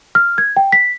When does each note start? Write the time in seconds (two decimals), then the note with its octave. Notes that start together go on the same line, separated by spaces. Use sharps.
0.15 F6
0.38 G#6
0.57 G5
0.72 B6